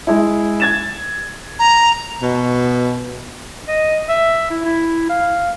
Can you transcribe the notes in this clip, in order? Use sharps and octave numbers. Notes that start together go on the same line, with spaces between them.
G#3 E4
G#6 A6 E7
A#5
B2
D#5
E5
E4
E4
F5